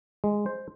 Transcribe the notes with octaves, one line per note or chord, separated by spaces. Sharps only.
G#3
C5